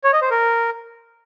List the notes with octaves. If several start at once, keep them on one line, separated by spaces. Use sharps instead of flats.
C#5
D#5
C5
A#4